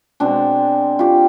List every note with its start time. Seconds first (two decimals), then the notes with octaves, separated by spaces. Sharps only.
0.20 B2 G#3 C4 D4
0.99 F4 G4